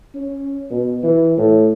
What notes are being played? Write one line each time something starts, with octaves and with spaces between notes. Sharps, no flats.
C#4
B2
E3
A2